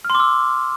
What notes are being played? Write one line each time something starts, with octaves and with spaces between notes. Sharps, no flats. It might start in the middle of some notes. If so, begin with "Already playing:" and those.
F6
C6
D6
E6